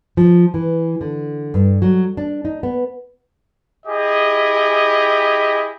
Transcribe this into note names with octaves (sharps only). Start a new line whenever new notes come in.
F3
E3
D3
G2
F#3
D4
D#4
B3
E4 G4 G#4 D#5